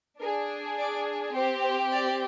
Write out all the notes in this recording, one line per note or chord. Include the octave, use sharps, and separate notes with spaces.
D4 G#4 A#4
D5
C4 G4 C5
C5
D5